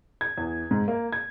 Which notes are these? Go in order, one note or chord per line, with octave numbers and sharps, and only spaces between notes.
G#6
E2
G#2
A#3
G#6